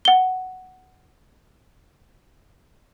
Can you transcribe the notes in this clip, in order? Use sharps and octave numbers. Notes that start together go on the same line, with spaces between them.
F#5 G7